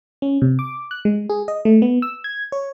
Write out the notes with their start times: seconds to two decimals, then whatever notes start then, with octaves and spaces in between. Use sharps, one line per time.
0.22 C#4
0.42 C3
0.59 D6
0.91 F#6
1.05 G#3
1.30 G#4
1.48 D#5
1.65 A3
1.82 B3
2.02 E6
2.24 G#6
2.52 C#5